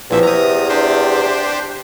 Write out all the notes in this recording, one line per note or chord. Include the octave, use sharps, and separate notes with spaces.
A#1 E2 C3 F3 E5
A#5 D#6
D4 G4 C5